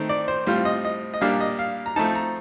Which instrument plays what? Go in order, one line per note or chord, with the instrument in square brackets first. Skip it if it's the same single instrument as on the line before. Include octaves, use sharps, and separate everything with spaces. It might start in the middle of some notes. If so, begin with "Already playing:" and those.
Already playing: [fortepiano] D#3 A3 C4 D#4
D5
C5
A2 G3 C4 F4 C5
D#5
D#5
D#5
A#2 G3 A#3 D4 F5
D#5
F5
A#5
F3 A3 C4 D#4 A5
A#5